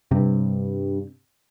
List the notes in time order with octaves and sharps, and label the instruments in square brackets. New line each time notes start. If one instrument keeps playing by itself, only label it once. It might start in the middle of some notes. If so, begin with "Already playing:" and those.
[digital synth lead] G2 [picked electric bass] C3